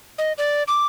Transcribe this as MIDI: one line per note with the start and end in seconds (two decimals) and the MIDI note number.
0.18 0.33 75
0.38 0.63 74
0.68 0.87 86